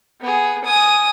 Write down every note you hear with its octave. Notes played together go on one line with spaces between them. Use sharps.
B3 G#4
G#5 D#6